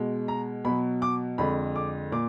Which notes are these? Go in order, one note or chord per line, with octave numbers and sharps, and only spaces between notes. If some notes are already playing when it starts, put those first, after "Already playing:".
Already playing: B2 G#3
A#5
B2 F#3 B5
D6
F2 D3 G#3 B5
D6
A#2 D6